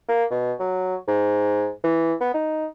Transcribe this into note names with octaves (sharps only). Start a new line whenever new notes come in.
A#3
B2
F#3
G#2
E3
B3
D#4